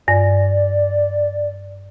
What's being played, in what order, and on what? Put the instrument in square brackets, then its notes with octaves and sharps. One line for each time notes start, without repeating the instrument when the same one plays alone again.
[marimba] G2 [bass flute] D5